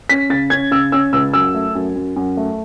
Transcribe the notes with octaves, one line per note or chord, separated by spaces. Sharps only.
C#4 B6
C#3 A6
C#4 G#6
C#3 E6
C#4 E6
C#2 E6
F#2 E6
A3
F#2
F#2
F#2
A3